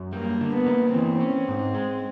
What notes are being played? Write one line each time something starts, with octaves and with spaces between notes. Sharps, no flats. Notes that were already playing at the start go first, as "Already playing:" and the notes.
Already playing: F#2
G3 A#3
D3
B3
A#3
E3 C4
C#4
G#2
G#3